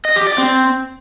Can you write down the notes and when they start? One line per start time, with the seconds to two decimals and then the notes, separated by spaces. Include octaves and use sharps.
0.05 D#5
0.16 G4
0.27 D5
0.38 C4